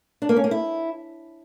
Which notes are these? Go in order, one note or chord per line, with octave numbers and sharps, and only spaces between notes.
D4
A#3
C#4
A#3
E4